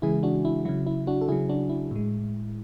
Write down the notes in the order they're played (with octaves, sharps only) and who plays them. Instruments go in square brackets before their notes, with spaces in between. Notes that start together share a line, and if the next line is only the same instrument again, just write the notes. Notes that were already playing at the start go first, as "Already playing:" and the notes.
[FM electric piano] C#3 E3 G#3 E4 G#4
D4 F#4
E4
C#3 F#3 E4
E4
D4 F#4
A4
C#3 F#3 E4 G#4
D4 F#4
E4
A2 G#3